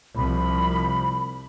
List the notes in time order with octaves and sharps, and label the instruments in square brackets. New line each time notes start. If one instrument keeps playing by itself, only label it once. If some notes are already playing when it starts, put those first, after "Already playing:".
[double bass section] C2 F3 [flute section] B5